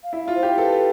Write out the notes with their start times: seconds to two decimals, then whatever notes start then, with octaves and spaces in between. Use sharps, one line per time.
0.04 F5
0.13 E4 E5
0.28 F4
0.35 C5
0.43 G4
0.58 A4 B4